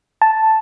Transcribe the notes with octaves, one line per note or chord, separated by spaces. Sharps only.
A5